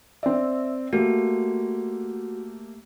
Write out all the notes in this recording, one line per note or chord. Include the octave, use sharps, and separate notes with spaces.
C4 D5 E5
A3 A#3 F#4 G4